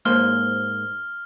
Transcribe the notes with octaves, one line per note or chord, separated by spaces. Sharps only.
G#2 A#3 C5 F6 G7